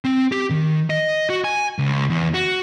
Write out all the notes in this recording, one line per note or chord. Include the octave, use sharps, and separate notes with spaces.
C4
G4
D#3
D#5
F#4
G#5
C#2
E2
F#4